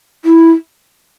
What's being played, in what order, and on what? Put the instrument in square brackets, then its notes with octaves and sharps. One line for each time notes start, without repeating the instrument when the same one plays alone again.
[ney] E4